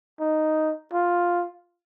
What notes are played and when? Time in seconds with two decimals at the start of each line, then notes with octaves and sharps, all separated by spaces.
0.20 D#4
0.93 F4